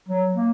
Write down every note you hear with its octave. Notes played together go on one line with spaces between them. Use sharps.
F#3
A#3